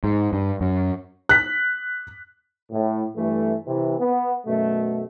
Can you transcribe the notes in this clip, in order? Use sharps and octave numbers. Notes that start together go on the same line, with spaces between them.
G#2
G2
F#2
F#6 B6
A2
G2 E3 A3
C3 E3
B3
F#2 B2 A3